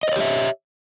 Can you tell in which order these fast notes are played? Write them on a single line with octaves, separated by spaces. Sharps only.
D#5 C5 C#5 G4 E5